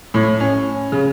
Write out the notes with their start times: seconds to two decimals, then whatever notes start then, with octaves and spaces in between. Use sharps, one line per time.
0.14 A2
0.40 C#4
0.92 C#3